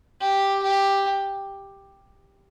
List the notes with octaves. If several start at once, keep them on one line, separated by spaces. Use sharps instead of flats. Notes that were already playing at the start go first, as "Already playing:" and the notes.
G4
G4